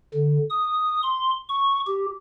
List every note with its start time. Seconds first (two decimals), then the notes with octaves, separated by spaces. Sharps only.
0.14 D3
0.50 D#6
1.03 C6
1.49 C#6
1.87 G4